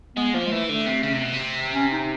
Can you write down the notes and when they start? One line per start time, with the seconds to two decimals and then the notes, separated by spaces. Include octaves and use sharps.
0.16 G#3 B3
0.33 F3 A#3
0.46 G#3
0.51 E3 A3
0.69 D3 A3
0.86 C3
1.03 C#3
1.13 C3
1.24 B2
1.34 C3
1.74 C#4
1.92 D#4